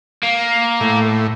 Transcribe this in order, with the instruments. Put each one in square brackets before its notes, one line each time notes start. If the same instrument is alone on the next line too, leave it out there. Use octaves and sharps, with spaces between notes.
[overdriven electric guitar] A#3
[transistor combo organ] A2